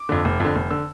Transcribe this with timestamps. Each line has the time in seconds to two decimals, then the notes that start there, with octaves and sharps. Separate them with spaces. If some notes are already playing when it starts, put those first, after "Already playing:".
Already playing: D6
0.09 F2 D3
0.25 F1
0.40 F2 D3
0.56 F1
0.71 D3 E6